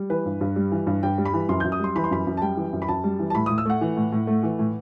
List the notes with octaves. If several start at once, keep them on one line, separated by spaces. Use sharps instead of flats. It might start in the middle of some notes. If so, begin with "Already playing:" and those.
Already playing: G3
E3 B4
G2
G2
G3
E3
G2
G2 G5
G3
B5
E3
F#2 C6
F#2 G6
D#6
G3 C6
E3 B5
C6
F#2 B5
F#2
A5
G3 G5
E3
F#2
B5
F#2 A5
G3
E3
A5
A2 B5
A2 D#6
E6
A3 F#5
E3
A2
A2
A3
E3
A2